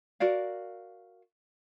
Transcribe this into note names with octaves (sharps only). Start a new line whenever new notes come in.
F#4 A#4 D5 F5